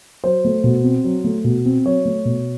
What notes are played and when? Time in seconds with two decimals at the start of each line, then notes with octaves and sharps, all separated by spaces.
0.24 F#3 C5
0.45 A3
0.64 B2
0.84 C4
1.04 F#3
1.24 A3
1.44 B2
1.66 C4
1.85 F#3 C#5
2.05 A3
2.25 B2